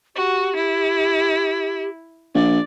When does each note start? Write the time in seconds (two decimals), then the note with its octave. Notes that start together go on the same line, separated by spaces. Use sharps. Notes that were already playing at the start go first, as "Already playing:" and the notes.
0.16 F#4 G4
0.55 E4
2.35 A#1 D5